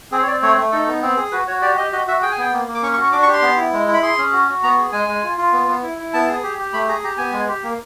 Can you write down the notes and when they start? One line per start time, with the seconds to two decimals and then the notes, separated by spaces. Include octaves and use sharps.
0.12 C4 G#4
0.23 C#5
0.27 C4 D5
0.42 A3 C#5
0.57 A3
0.72 D#4 A4
0.87 B3
1.02 C4
1.17 G#4
1.32 F#4 B4
1.47 F#4 C#5
1.62 G4 D5
1.77 G4 D#5
1.92 F#4 D#5
2.07 F#4 E5
2.22 G#4 G5
2.31 G#5
2.38 B3 G5
2.53 A#3
2.68 A#3
2.74 D6
2.83 C#4 C#6
2.93 C#6
2.98 F#4
3.03 C#6
3.13 D4 D6
3.23 C#6
3.28 G4
3.33 C6
3.42 B3
3.57 E4
3.73 G#3
3.88 E4
3.94 B5
4.02 G#4 C6
4.18 C#4
4.33 F#4
4.48 F#4
4.63 B3 A#5
4.78 G#4
4.92 G#3 G#5
5.08 G#3
5.24 F4
5.38 F4
5.53 B3
5.68 B3
5.83 E4
5.98 E4
6.13 B3 A5
6.28 G#4
6.43 G4
6.59 G4
6.73 A3 B5
6.88 G#4 A#5
7.03 G4 A#5
7.18 B3 G#5
7.33 G#3
7.48 G4
7.63 A#3